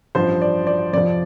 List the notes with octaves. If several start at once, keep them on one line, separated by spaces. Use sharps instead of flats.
A1 G2 F3 C5
D5
D5
F2 C3 F3 D5